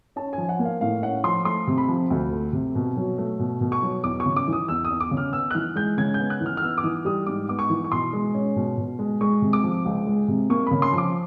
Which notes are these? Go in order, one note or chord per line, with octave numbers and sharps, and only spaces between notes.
C#4 A5
F3 G#5
F#5
A#3
F5
A2 F5
C#4 F#5
F3 C6
A3 C6
C3
B5
F3
D2
A3
C3
B2
F#3
A3
B2
B2
C#6
F#3
E2 D6
C#6
C#3
D6
E3 D#6
E2 E6
D#6
E2
D6
C#3
F6
B3 E6
F#6
E3 F6
G#3 G6
C#3 G#6
B3 G6
F#6
E3
F6
F6
B3 E6
D6
E3 D#6
G3 D#6
G#2 D6
B3 D6
C#6
E3
C#6
B2 C6
G#3
C#4
B2
B2
G#3
G#3 C#6
C3
D6
F3
C#2
G#3
C3
A#3 C#6
C#3 B5
C6
F3
D6